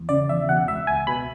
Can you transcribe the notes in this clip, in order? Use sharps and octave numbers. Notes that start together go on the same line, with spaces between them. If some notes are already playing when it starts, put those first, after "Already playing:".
Already playing: E2
C#3 D5
E2 E5
B2 F#5
C#2 E5
C#2 G#5
B2 B5